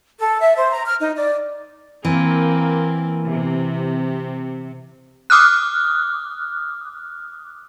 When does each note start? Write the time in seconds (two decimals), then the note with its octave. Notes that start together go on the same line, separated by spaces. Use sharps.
0.20 A4
0.41 E5
0.57 C5
0.73 A#5
0.87 F6
1.00 D#4
1.16 D5
2.05 E3 A#3 C4
3.27 C3
5.30 D6 D#6 F6 F#6